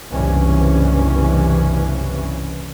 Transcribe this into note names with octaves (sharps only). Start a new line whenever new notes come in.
F#1 C2 G2 E3 C#4